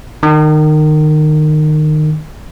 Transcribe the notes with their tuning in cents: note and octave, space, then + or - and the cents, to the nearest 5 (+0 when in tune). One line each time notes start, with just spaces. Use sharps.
D#3 -25